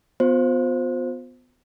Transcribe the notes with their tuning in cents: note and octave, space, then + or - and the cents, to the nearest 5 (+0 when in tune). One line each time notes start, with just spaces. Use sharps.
B3 +20 F4 +35 C5 +0